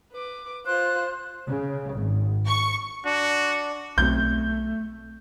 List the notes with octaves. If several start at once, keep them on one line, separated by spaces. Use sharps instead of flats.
B4 D6
F4 C5 F#6
C#3
G#1
C#6
D4 F#4
B1 A3 C4 G6